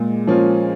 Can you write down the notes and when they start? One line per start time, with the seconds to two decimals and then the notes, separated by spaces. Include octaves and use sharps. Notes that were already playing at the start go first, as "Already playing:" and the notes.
Already playing: A#2 G#3
0.27 F3 A#3 C#4 F4